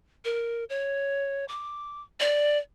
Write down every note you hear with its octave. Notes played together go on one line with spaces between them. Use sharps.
A#4
C#5
D6
D5